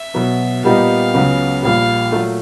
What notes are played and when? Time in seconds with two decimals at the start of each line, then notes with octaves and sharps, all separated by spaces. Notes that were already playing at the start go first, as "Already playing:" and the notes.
Already playing: E5
0.14 B2 F#3 B3
0.64 A#2 G3 B3 D#4 G4 F5
1.14 C#2 C#3 F#3 B3
1.63 A#1 A#2 G3 F5
2.12 A#2 F#3 A3